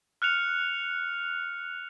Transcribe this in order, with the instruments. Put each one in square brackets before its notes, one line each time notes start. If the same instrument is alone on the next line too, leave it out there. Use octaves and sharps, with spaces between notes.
[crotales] F6 F#6 C#7 F7